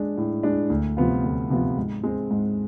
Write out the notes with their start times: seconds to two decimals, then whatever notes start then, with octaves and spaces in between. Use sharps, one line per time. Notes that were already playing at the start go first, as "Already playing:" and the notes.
Already playing: G#3 D4
0.17 A2
0.43 G#3 D4
0.70 D2
0.97 C3 F3 B3 F4
1.23 D2
1.50 C3 F3 B3 F4
1.77 G#2
2.04 G#3 C4
2.31 G#2